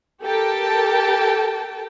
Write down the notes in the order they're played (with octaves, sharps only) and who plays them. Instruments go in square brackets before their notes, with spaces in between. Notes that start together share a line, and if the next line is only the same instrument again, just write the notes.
[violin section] G4 A4 A#4 G5 A5